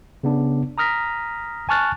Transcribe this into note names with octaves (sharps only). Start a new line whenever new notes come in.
C#3 B3 D4
A#5 D#6 F6 A#6 B6
G#5 A5 C#6 F6 F#6 A6